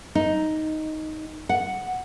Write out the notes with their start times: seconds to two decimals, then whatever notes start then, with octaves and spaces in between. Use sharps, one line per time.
0.15 D#4
1.49 F#5